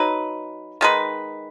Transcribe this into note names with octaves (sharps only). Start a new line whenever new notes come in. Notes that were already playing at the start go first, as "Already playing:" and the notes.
Already playing: F#3 D#4 B4
D#3 G#3 D#4 B4